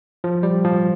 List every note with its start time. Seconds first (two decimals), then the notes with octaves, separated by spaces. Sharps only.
0.24 F3
0.43 G3
0.64 F3